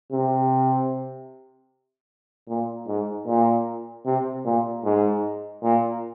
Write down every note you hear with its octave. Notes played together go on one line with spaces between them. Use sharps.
C3
A#2
G#2
A#2
C3
A#2
G#2
A#2